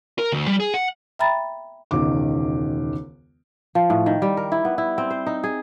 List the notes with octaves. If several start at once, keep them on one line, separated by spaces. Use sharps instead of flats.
A#4
D2
G3
G#4
F#5
E5 G5 A#5 B5 A6
E1 C#2 D#3 D6
F3
A2
D#3
G3
A#4
E4
B3
E4
C4
C5
D#4
G#4